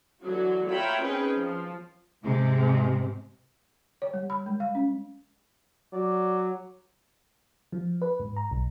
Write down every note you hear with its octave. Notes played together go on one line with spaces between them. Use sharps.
D3 E3 F#3 F#4
F4 C#5 E5 G5 A#5 B5
C4 C#4 D#4 G#4 B4 G5
F3
G#2 C3 G#3
C#5
G3
B5
G#3
F5
C#4
F#3 D5
F3
B4
G#2
A#5
B1